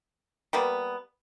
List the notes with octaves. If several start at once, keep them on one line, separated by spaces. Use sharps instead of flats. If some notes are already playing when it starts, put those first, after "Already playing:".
G3 A#3 B3